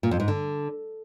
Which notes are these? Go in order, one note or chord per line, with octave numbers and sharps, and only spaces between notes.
A#2
F2
G#2
D3